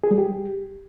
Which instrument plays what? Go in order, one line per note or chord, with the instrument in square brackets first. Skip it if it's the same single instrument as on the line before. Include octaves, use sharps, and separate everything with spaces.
[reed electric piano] G#4
G3
G4